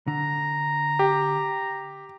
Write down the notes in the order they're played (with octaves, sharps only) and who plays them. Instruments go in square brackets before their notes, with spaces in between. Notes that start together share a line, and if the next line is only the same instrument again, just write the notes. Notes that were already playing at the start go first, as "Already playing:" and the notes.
[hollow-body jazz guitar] D3 [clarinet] A#5
[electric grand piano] G4